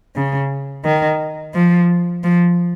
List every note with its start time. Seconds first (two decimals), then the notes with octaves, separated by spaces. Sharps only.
0.16 C#3
0.85 D#3
1.54 F3
2.24 F3